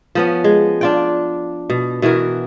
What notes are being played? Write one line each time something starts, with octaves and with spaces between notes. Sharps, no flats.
F3 B3 C#4
G#3
D4 F4 G5
B2
B2 E3 F#4 A#4